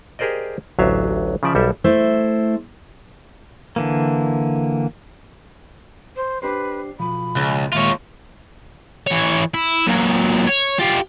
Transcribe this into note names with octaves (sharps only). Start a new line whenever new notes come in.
G4 G#4 A#4 C5 D5 D#5
A1 D2 F#3 D4 E5 F5
C#3 F3 D5 E5
B1 G3 A4 A#4 E5
A3 E4 C5
D3 E3 A#3
C5
D4 G4 B4 C5
B1 F3 B5
C#2
D#2 A#2 G#3 F4 C#5 E5
E3 C#5
E4
A#2 F#3
C#5
F4 G4